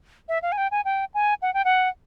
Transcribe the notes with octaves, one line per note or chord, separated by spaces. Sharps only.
E5
F5
G#5
G5
G#5
G5
G#5
F#5
G5
F#5